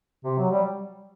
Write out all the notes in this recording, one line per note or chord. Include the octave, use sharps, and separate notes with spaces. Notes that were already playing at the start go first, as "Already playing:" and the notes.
C3
F#3
G3